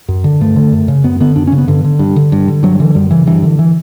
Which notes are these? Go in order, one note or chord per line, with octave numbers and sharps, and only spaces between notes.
F#2
D3
G2 A3
D3
F#2
C#3
F#2 B3
D3 B3
F#2 D4
C#4
C#3
B3
G2 D3
D3
G2
D3
G2
D3
G2 F#3
D3 E3
F#2 G3
C#3 E3
G2 E3
D3 E3
E3